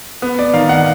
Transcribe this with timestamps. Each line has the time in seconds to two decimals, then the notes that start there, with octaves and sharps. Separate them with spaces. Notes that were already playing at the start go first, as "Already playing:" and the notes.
0.22 B3
0.39 D5
0.54 D#3 F5
0.69 F#5